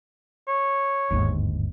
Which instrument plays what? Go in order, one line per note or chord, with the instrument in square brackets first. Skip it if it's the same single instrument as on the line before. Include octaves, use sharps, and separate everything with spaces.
[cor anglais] C#5
[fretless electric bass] G1 D#2 G#2